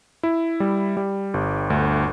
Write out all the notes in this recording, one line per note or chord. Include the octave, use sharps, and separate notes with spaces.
E4
G3
G3
G1
D2